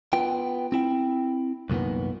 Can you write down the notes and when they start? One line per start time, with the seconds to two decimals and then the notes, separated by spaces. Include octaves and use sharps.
0.13 B3 F4 G5
0.72 C4 E4 G5
1.70 C2 F#2 A#2 D#3 B3